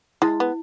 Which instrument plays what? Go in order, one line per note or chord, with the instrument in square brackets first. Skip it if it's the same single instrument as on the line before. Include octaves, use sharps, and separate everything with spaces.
[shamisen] G#3 [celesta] E4
[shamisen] B3